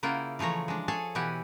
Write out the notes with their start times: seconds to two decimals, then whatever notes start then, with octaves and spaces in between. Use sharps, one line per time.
0.03 C#3 A#3 E4 F4 F#5 G5
0.39 E3 F3 A3 C#5 A#5
0.68 G#3 D4
0.88 G#4 A4 C#5 G#5 A5
1.15 B2 E3 E4 G4 F#5 G#5